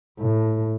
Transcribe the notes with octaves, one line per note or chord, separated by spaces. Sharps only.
A2